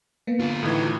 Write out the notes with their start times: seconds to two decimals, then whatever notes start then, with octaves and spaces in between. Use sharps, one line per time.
0.27 A#3 B3
0.40 D3 F4
0.63 A2 D#3 E3